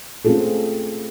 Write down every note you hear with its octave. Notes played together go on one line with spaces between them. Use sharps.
A3 C4 C#4 F4 G#4 A4